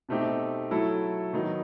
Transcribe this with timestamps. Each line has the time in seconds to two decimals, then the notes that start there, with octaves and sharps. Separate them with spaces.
0.09 B2 A3 C4 D#4 G4
0.71 F#3 A3 E4 A4
1.33 D#3 F#3 B3 D#4